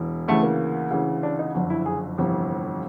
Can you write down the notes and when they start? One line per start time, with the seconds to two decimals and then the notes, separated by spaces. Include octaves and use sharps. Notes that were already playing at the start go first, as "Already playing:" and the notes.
Already playing: E1 E3
0.28 D2 C#3 E3 A3
0.43 A#3
0.91 D2 C#3 E3
1.23 D4
1.39 D#4
1.55 F#1 F2 D3
1.70 E4
1.86 G#4
2.18 G1 F2 C3 E3